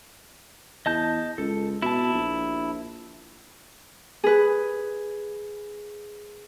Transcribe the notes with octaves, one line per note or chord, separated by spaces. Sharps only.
E2 D#5 A5 G6
C#2 A4
B2 E4 A5
A#1
G#4 B4